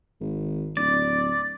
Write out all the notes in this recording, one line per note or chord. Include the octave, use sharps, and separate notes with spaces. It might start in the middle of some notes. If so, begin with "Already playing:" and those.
G#1
D1 D5